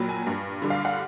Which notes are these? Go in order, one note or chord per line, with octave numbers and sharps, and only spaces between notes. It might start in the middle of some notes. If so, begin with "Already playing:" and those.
Already playing: A#1 A#2 F#3 B5
G#5
G2
D3 G3
F5
F#5